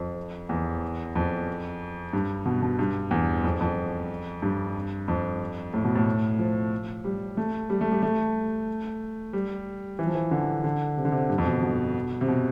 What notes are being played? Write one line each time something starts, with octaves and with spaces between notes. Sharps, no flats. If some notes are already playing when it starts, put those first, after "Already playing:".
Already playing: F2
E2
F2
G2
B2
B2
G2
E2
F2
F2
G2
F2
A2
B2
A2
F3
G3
A3
G3
A3
G3
A3
G3
E3
F3
E3
D3
D3
C3
D3
C3
G2
F2
B2
B2
C3
B2